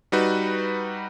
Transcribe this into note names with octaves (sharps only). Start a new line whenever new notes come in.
G3 D#4 F#4 B4